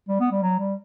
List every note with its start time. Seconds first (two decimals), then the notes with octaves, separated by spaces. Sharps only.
0.09 G3
0.20 B3
0.31 G3
0.42 F#3
0.59 G3